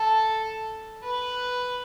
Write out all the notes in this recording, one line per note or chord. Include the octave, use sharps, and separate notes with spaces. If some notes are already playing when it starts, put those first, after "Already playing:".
Already playing: A4
B4